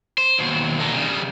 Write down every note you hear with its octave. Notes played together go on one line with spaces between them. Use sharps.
C5
D#2 B2
D3 D#4
C#3 G3